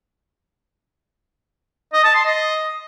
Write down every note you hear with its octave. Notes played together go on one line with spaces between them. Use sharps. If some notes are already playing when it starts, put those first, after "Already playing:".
D#5
A5
C6
D#5